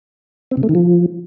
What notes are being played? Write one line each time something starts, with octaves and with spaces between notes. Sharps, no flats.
C4
C3
A3
D#3
F3